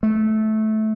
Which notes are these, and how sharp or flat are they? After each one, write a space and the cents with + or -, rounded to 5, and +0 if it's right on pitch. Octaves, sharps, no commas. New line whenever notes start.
A3 -15